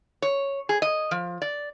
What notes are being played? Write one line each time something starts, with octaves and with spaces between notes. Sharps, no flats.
C#5
G#4
D#5
F3
D5